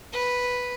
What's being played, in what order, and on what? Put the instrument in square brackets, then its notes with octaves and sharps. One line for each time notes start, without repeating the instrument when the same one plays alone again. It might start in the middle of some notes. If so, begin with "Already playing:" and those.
[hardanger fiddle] B4